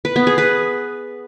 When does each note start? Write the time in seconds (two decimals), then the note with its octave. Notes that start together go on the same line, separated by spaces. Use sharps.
0.05 B4
0.16 B3
0.27 G#4
0.38 B4